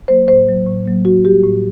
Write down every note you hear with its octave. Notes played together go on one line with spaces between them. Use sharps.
F#3 A#3 C5
A2 C5
F#3 A#3
A2
F#3 A#3
A2 F#4
G3 A#3 G4
A2